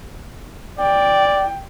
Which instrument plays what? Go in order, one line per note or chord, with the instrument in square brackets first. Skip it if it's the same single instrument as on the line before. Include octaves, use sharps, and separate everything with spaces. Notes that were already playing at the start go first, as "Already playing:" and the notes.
[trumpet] D5 [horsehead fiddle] G5